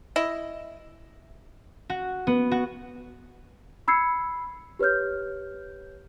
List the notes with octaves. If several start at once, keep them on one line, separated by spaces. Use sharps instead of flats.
E4 D#5
F#4
B3
F#4
B5 E6 G#6 C7 C#7
G4 B4 C#5 F6 G6